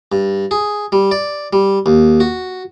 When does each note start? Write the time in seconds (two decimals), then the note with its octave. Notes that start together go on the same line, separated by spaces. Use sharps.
0.12 G2
0.51 G#4
0.92 G3
1.11 D5
1.53 G3
1.86 D#2
2.20 F#4